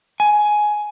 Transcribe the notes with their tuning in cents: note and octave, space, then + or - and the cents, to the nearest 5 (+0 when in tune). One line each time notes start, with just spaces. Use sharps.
G#5 +15